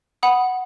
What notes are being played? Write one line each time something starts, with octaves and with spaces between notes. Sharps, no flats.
F#5 B5 D#6